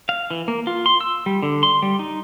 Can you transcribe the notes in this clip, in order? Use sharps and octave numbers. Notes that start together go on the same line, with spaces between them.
F5
E3
A#3
F4
C6
E6
G3
D3
C6
G3
D#4